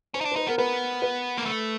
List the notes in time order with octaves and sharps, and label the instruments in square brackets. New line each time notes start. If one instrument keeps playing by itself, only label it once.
[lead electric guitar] C#4 [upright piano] C5
[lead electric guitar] D#4
D4
[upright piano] C5
[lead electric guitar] D#4 [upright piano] B4
[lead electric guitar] B3 [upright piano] A#4
[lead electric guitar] B3 [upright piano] B4
[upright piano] B4
[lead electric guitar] A#3
A3